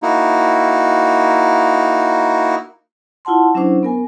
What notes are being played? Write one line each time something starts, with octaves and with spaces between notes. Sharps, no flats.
A#3 D#4 E4 F#4
E4 F4 F#5 A5 C6
F#3 C#4 D4 E4 C5 D6
B3 A#4 G#5